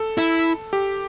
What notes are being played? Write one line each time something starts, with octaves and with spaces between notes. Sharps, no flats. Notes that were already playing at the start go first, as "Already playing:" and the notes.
Already playing: A4
E4
G4